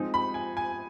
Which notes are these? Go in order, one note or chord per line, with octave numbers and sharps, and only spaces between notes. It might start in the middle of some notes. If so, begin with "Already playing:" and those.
Already playing: F3 G#3 C4 D#4
B5
G#5
G#5